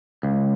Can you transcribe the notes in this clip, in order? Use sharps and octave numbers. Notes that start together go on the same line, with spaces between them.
C#2